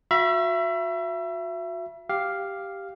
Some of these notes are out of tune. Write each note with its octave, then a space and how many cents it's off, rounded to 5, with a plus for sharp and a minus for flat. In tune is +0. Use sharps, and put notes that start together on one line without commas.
F#4 -35 E5 +30 B5 -35
G4 +0 F5 +0